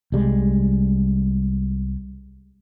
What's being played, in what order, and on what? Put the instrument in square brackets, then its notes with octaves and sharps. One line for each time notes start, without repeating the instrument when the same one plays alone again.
[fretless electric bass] C2 G3 G#3